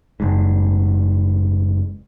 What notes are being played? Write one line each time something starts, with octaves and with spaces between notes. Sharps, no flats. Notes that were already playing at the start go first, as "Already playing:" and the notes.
F#1 G#2